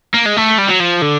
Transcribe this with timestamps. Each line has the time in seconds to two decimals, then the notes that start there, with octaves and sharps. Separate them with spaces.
0.14 A#3
0.26 G#3
0.37 A3
0.59 G3
0.69 F#3
0.80 F3
1.02 D3